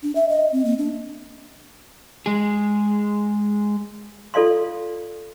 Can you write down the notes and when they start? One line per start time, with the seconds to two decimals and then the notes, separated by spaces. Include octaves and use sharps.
0.03 D4
0.15 E5
0.29 D#5
0.52 C4
0.65 A#3
0.78 D4
2.26 G#3 G#4
4.34 F4 A4 D5 F5 C6